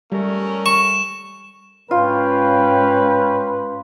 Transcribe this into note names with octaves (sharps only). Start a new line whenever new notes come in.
G3 A3 C#4 A#4
C#6 E7
G#2 C#4 F4 B4 C#5 F5 G5